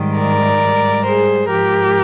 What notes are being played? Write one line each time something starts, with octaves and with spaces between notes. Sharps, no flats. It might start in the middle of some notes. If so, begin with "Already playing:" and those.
Already playing: G#2 D#3 G3
A#4 D5
G#2 G3
G#4 C5
G#2 F3 G4 A#4